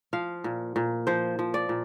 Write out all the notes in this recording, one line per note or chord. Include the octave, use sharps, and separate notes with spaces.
F3 F5
A#2
A#2
F3 C5
F3
D5
A#2